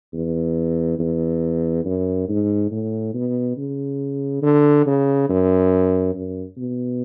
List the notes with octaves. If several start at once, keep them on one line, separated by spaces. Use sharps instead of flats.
E2
E2
F#2
G#2
A2
B2
C#3
D3
C#3
F#2
F#2
B2